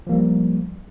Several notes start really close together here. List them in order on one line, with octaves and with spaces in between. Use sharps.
F3 A#3 G3